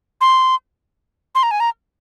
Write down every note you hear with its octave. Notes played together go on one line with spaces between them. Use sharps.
C6
C6
A#5
G#5
A#5